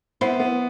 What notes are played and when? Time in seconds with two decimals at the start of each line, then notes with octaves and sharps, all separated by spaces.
0.21 B3 C4 E4
0.40 B3